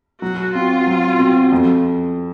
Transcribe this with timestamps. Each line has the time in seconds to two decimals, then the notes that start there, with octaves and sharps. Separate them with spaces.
0.21 F#3 F#4
0.55 C4 F4 F#4
0.87 F#3
1.19 C4 F#4
1.52 F2